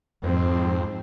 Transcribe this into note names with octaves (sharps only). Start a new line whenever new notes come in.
F2 G#2 F3 C4